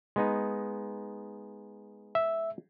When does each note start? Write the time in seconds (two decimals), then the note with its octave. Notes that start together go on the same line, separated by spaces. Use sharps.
0.16 G#3 B3 D#4
2.15 E5